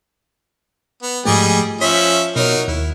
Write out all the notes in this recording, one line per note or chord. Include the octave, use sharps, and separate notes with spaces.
B3
G#2 F3 G3 A3 G#4 D#5
F3 C#4 C#5 E5 B6
B2 F#3 D#4 A#4 C#5
D#2 E4